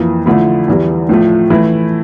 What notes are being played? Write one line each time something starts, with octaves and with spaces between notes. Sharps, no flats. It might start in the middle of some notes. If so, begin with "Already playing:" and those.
Already playing: F2 E3 A#3
D3 F3 A3 E4
E2 E3 G3
A2 F3 A3
E3 A3 E4